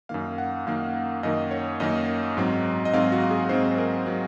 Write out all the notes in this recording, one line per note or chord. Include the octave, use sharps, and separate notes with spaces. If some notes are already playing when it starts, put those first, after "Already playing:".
F#2 D#3 A#3 F5
F#5
F#2 D#3 A#3 F5
F#2 D#3 A#3 D#5
C#5
F#2 D#3 A#3 D#5
G#2 F#3 C4
D#5
G#2 F#3 C4 F5
F#4
G#4
G#2 F#3 C4 C5
A#4
F#3 C4